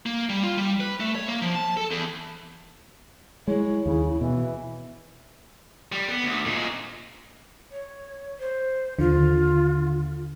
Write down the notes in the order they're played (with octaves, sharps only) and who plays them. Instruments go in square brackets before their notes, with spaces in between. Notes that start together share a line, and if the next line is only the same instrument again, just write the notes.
[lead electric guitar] A#3
G3
F4
G3
B4
A3
C#5
A#3
F3
A5
A4
E2
[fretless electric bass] G#3 [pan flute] E4 [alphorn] C#5
[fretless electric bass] D#2 [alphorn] C#3
[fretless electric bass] B2 [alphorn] E3
[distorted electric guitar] G3
B3
D2
A#2 G#3
[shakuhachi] C#5
C5
[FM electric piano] D#2 D3 [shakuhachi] F4